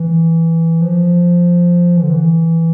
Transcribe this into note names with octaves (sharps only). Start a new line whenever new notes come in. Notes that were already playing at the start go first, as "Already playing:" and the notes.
Already playing: E3
F3
E3
D3
E3